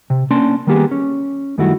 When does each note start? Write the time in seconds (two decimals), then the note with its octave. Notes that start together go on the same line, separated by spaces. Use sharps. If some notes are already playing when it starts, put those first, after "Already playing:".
0.10 C3
0.31 A#3 C#4 D4 A5 C6
0.67 D#3 G3 A#3 B3 G4 G#4
0.91 C#4
1.58 F#2 D#3 G3 A3 E4 F#4